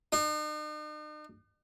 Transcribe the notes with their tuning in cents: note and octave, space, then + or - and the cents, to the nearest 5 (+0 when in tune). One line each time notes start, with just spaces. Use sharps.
D#4 -45